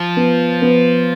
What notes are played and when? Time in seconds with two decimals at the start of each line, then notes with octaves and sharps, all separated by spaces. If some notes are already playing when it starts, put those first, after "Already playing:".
Already playing: F3
0.17 B3
0.62 B3